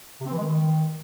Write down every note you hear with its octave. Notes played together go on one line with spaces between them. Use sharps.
C3
C4
E3
G#3
D#3